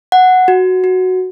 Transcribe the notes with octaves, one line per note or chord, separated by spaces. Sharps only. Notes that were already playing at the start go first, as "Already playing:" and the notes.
F#5
F#4
F#4